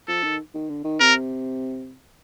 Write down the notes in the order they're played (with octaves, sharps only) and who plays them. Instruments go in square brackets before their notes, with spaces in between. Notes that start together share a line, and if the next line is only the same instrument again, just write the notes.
[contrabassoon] F3 [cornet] A4
[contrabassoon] D#3
D#3
D3
D#3
[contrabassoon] C3 [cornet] A#4